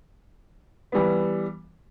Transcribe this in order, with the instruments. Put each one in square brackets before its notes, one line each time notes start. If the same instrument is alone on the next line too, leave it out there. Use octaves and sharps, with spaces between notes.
[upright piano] E3 G3 B3